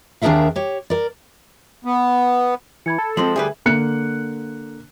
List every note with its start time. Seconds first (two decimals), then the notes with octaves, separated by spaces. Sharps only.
0.22 D#2 D4 G#4 A#4 E5 F5
0.56 G4 C#5
0.90 A#4 D5
1.85 B3
2.86 E3 B5 G#6 C#7
2.98 A4
3.17 F3 G#3 C4 C6 F#7
3.36 D2 G3 G#4 B4 E5
3.66 D3 A#3 F#6 C#7